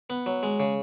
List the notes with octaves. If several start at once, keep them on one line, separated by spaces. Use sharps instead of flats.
B3
F#3
G#3
C#3